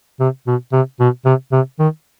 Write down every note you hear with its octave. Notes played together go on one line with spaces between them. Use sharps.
C3
B2
C3
B2
C3
C3
D#3